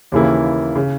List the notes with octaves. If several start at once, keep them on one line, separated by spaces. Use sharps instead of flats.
D#2 C#3 E3 A#3 E4
C#3